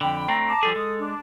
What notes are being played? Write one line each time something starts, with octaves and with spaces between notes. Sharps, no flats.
F2 D3 G5 B5
A3 C4 D4 A#5
A5 D6
F3 G3 G#4 A4
G#3 D#6
D4